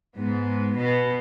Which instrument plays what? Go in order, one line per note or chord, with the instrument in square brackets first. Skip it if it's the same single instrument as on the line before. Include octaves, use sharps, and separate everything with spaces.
[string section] G#2 [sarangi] B3
[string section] B2